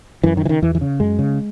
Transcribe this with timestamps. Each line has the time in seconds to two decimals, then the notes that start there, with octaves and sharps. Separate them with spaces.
0.23 F#2 E3
0.37 D#3
0.43 C#3 E3
0.49 D#3
0.62 E2 E3
0.75 E3
0.81 C#3
1.00 F#2 G#3
1.19 C#3